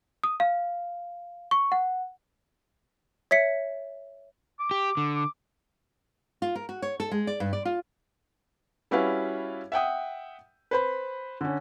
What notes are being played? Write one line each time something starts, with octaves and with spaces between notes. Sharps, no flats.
D#6
F5
C#6
F#5
C#5 E5 B6 C#7
D6
G4
D3
D6
F4
A#4
F#4
C#5
A4
G#3
D5
G2
D5
F4
G3 C#4 E4 F#4 B4 F5
E5 F#5 G5 D#6
B4 C5 B5
D3 C#4